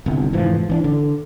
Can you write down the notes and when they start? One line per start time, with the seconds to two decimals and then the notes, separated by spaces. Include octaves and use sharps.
0.06 G1 C2
0.33 F1 G#2 E3 F3
0.70 E3 C#4 D4
0.84 D3